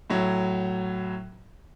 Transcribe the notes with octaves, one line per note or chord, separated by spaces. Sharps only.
A2 F#3